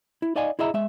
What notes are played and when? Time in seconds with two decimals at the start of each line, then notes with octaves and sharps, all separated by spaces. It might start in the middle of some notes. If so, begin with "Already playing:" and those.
0.22 E4
0.36 D#4 D5 D#5 F5 G#5
0.59 E4 G#4 D#5 E5 G5 A#5
0.74 G#3 E5